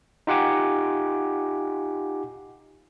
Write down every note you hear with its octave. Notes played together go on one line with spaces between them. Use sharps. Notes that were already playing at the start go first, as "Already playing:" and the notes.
D#4 F4 G4 F#5 G#5 D6